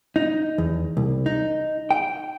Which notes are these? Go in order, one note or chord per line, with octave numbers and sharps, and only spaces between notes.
D#4
E2
C2
D#4
G5